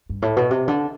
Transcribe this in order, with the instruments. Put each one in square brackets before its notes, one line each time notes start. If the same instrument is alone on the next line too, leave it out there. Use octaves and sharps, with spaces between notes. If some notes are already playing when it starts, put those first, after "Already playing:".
[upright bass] G2
A2
B2
C3
D3